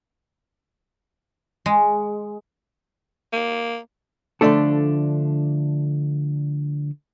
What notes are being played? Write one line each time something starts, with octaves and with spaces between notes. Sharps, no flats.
G#3
A#3
D3 F3 A3 D4 A4